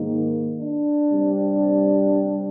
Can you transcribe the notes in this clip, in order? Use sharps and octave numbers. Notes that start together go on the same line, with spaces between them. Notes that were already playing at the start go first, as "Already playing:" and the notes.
Already playing: G#2 D#3 A#3
D4
C3 G3 C4